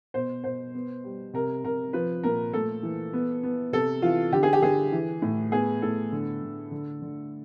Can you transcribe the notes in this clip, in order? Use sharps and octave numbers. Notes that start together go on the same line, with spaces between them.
B2 C5
B2 C5
B3
G3
C3 A#4
C3 A#4
F3 B4
A#2 A#4
A3 A4
E3
B3
B3
C3 A4
E3 F4
D3 G4
G#4
G4
D3 G#4
E3
A2
B3 G#4
A2 A4
D3
D3
D3
D3